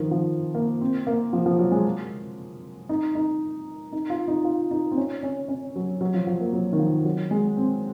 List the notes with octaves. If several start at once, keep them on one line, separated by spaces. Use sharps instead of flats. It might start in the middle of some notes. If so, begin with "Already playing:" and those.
Already playing: D#3 F3
F3
A#3
C4
A#3
F3
F3
F#3
G#3
D#4
D#4
D#4
F4
D#4
F4
D#4
C4
C#4
C#4
C#4
F#3
F#3
F3
F3
A#3
F#3
D#3
F3
F#3
G#3
C4